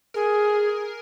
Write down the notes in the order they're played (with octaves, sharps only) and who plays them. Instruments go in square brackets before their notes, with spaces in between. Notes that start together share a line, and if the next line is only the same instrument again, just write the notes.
[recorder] G#4 [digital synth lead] A#4